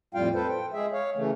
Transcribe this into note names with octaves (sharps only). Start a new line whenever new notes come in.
F2 A2 G3 F4 F5 G5
A4 B4 C5
G5
G#3 G#4 E5
C#5 F5
C#3 E3 A3